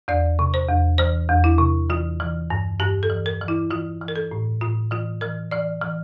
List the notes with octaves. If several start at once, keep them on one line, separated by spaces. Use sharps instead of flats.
E2 D5
C3
C5
E2
E3 C5
E2
E4
C3
E3 F4
E3
G2
G2 G4
A4
E3
A#4
E3
E4
E3 F4
E3
A#4
A4
A2
A2 F4
E3 F4
E3 A#4
E3 D5
E3